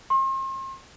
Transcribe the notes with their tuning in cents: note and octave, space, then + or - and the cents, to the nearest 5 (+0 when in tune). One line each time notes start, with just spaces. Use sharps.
C6 +40